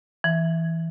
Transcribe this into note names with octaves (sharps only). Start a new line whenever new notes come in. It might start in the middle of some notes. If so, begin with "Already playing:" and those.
E3